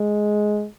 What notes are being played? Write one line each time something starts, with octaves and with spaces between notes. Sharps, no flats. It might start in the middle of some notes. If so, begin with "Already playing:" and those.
Already playing: G#3